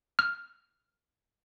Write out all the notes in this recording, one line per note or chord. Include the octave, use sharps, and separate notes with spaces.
F6